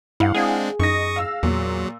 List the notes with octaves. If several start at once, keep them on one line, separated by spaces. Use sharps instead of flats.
G2 E4 F5 F#5
G#3 C4 D4 G#4
F#2 D#4 D#5 C#6 D#6 A#6
F5 E6
E2 A#2 F#3